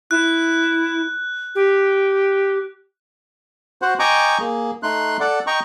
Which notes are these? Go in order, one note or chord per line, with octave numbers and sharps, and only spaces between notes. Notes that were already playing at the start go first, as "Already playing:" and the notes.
E4 F#6
G4
F#4 C5 F#5
D#5 G5 G#5 A#5 C#6 D6
A#3 G#4
A3 D#4 C6 F#6
A4 D5 F#5
D#5 G5 A#5 C#6